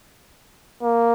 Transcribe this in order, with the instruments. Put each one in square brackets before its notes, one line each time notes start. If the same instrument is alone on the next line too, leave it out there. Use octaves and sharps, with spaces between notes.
[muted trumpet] A#3